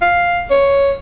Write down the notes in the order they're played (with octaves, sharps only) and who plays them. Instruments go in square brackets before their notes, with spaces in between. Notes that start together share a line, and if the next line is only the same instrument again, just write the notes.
[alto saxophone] F5
C#5